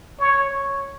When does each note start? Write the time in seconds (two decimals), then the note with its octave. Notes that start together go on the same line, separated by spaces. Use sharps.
0.19 C#5
0.50 C#5